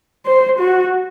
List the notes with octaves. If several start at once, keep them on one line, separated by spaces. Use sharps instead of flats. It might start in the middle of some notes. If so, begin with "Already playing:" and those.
C5
F#4